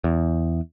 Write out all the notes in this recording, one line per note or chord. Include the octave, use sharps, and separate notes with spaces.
E2